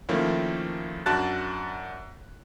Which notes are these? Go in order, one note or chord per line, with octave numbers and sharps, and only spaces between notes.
D#3 F3 A3 A#3 C#4 E4
F#2 D4 F#4 A5 F#6 A6